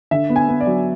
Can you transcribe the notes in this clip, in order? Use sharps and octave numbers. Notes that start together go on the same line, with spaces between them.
D3 E5
B3
G#5
B3
D5
F#3